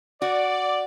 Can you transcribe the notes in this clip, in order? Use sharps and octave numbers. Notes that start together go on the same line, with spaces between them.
F#4 D5